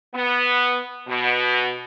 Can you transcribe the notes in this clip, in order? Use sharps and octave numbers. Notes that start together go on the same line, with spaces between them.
B3
B2